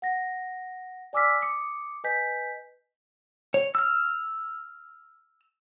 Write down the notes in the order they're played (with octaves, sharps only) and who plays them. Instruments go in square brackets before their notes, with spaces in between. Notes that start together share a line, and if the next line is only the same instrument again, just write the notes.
[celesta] F#5 A#6
D5 G#5 D6 E6 F6 B6
D6 D#6 C#7
B4 D#5 G#5 G6 B6
[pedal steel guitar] C#5
E6 F6